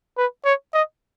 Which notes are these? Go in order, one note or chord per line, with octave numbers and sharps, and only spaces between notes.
B4
C#5
D#5